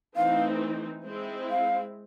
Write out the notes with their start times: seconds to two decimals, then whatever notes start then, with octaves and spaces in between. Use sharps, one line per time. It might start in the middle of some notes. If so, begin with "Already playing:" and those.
0.16 E3 A3 C4 D#4 F5
1.05 G#3 C4 E4
1.50 F5